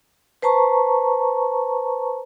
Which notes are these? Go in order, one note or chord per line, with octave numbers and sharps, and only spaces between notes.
B4 C5 A5 A#5 C#6